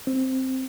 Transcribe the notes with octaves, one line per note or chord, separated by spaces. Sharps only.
C4